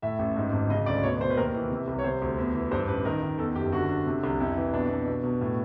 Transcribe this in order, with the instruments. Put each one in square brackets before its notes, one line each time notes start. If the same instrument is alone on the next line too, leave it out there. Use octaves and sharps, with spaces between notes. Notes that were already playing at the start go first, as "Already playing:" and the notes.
[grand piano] A2 E5
A1
G#2
G#1
C#3 D#5
D2 D5
B2 C#5
B2 C5
B4
D#2 A#4
E3
C3
C2
C#5
C3 C5
D2
E2
E3
G2 C5
A1 B4
D#3 A#4
D#3
E2 A4
F#1 G4
D3 F#4
D3
C3
C2
F2 E4
E3
B2 D4
B2
B2
B2
A2